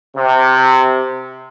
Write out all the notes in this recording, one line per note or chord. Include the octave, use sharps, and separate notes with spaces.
C3